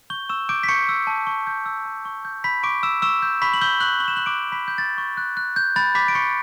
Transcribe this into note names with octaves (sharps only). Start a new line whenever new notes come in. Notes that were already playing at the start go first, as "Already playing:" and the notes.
C#6 G6 G7
C#6 E6 E7
D6 G6 D7
B6
C#6 G6 C#7
E6
A5
C#6
G6
E6
A5
C#6
G6
B5 G6 B6
C#6 D6 D7
E6 E7
C#6 E6 E7
G6
B5 C#6 B6
F#7
E6 G6 G7
C#6 F#6 F#7
C#6 F#7
E7
C#6 F#6 F#7
D6 D7
F#6
B5 B6
F#6
G6
C#6 A6
C#6
F#6
F#6
G6
B5 A6
B5 D6 B6
D7
B5 C#6 C#7